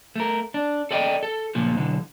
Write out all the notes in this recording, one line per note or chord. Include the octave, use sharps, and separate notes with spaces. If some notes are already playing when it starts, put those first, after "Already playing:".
A3 A#4
D4
A4 D5 D#5 G5
A4
C#2 A#2 F3
B1 D3 E3